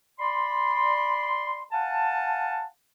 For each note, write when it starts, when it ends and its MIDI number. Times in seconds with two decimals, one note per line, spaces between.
0.20 1.64 74
0.20 1.64 83
0.20 1.64 84
1.72 2.65 77
1.72 2.65 78
1.72 2.65 80
1.72 2.65 81